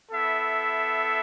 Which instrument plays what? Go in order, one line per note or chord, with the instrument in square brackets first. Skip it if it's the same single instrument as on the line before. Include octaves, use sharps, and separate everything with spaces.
[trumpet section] B3 E4 A4 E5